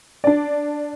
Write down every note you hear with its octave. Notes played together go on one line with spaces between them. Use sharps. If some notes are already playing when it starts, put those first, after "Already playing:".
D4 D5